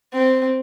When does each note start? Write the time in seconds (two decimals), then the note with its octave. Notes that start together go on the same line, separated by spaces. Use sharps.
0.13 C4